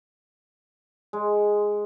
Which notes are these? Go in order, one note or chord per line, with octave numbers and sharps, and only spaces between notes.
G#3